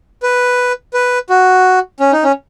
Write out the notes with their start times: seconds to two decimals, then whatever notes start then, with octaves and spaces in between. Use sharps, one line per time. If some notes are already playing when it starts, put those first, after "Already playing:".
0.23 B4
0.94 B4
1.30 F#4
2.00 C#4
2.12 D#4
2.24 C#4